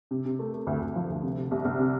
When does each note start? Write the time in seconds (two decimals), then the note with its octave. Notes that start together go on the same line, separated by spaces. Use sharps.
0.11 C3
0.25 C3
0.39 A3
0.54 A3
0.67 D2
0.81 D2
0.96 F3
1.10 D2
1.23 C3
1.37 C3
1.51 C2
1.65 C2
1.79 C3